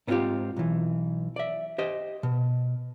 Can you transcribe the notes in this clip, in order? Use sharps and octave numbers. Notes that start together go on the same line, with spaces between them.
G#2 B3 C4 D4 F4 G4
B1 E3
D5 E5
G4 C5 D#5
B2